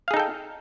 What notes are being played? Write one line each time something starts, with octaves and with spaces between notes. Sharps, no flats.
D#4 G#4 A4 F5 G5